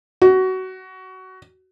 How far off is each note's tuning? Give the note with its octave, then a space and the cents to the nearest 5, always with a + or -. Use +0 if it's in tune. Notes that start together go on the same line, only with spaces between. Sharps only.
F#4 +20